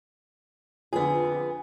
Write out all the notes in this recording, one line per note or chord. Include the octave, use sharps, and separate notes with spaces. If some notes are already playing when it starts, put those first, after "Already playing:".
F2 D3 B3 G#4